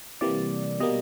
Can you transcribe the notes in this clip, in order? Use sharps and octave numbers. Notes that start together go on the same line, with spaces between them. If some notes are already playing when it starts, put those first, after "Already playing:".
C3 E3 G3 A#3 D5
B2 G3 A#3 D#5